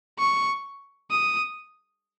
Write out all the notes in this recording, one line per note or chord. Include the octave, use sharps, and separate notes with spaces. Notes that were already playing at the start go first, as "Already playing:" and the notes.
C#6
D#6